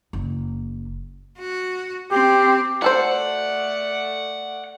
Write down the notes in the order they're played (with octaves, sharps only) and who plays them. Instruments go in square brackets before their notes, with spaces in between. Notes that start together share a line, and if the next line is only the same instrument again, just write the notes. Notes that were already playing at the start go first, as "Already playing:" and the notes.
[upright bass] F#1
[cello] F#4
[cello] C4 [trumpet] G4
[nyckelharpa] A3 D5 [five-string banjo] F#4 A4 C5 [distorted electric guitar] F#5